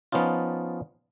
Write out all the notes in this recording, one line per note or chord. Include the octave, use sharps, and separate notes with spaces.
F3 B3 C#4 D#4 F4